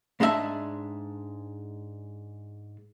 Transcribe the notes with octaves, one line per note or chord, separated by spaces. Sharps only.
G#2 G#3 D4 F4 E5 A5